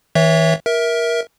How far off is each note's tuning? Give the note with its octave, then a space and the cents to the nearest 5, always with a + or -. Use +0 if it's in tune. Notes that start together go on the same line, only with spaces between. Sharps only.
E3 -35 C#5 +0 E5 +0
A#4 +15 E5 -10